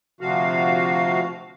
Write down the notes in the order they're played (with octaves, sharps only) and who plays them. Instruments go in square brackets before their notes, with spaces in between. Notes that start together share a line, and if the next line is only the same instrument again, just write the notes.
[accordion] D2 C3 F3 F#4 F5